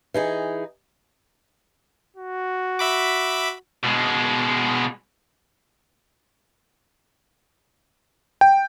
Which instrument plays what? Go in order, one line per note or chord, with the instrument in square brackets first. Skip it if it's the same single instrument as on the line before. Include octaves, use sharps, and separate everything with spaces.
[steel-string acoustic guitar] E3 D#4 G#4
[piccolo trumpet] F#4
[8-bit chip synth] E5 B5 D6
[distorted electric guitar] B2 G#3
[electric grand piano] G5